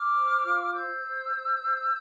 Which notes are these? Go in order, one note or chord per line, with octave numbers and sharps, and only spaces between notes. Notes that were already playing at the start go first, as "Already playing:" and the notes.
Already playing: D6 F6
C5
F4
C5 E6 G6
C5
C5
C5